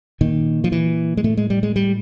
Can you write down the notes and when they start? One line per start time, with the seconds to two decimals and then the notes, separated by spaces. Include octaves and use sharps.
0.21 A#2 D#3
0.64 F3
0.72 E3
1.17 G#3
1.24 A2 A3
1.37 G#3
1.50 G3
1.63 G#3
1.76 G3